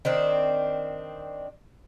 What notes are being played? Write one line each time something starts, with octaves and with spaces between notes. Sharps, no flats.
D#3 C4 D4